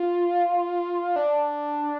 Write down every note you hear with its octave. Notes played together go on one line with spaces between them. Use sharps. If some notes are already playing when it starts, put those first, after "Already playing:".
Already playing: F4
D4